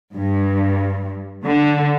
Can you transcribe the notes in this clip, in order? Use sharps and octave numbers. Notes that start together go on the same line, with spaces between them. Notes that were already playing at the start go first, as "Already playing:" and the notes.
G2
D3